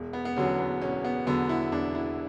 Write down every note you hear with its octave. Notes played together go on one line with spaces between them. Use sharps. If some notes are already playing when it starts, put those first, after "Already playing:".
Already playing: E1
B3
B3
E2 D3 F#3 C#4
B3
E1 C#4
B3
E2 D3 F#3 B3
E4
E1 D4
E4